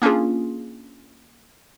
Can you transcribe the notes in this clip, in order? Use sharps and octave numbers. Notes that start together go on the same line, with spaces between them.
A#3 C#4 D4 F4 G#4